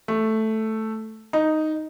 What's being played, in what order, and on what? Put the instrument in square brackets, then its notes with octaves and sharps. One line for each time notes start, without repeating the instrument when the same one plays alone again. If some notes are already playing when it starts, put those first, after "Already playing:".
[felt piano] A3
D#4